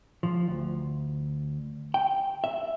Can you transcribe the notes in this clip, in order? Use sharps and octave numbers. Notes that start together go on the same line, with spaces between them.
F3
D2
G5
E5